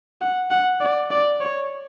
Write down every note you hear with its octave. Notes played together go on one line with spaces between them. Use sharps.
F#5
F#5
D5
D5
C#5